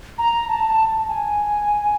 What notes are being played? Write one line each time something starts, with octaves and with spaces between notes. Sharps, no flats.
A#5
A5
A5
G#5